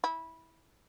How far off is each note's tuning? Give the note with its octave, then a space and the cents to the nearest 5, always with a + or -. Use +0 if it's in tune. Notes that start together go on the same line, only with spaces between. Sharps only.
E4 -15